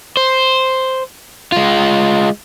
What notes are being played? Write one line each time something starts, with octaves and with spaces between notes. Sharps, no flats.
C5
G#3 F4